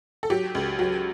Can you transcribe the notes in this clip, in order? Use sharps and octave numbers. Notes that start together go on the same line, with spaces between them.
A4
F#3 G4
C#2
F#3